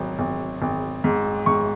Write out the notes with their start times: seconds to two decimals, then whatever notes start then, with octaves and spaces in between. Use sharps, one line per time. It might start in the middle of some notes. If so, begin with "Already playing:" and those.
Already playing: G#1 F#3
0.19 G#1
0.62 G#1
1.04 G#2
1.46 G#2 C#6